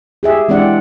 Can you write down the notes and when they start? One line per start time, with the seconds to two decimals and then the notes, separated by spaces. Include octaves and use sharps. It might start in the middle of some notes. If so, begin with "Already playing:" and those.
0.23 G4 G#4 E5
0.49 E3 G#3 C4 D4 D5 F#5